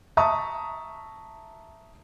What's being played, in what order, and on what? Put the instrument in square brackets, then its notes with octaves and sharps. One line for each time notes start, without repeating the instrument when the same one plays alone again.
[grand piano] E5 A5 A#5 C#6 D#6